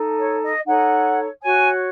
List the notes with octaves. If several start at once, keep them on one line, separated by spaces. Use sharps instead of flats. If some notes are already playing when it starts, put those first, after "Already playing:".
Already playing: D#4 A4
C#5
D#5
D#4 A4 C#5 F#5
F#4 C#5 G#5